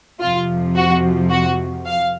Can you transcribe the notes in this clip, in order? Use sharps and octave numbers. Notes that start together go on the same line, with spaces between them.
F2 C3 F3 F4
F#4
F#4
F5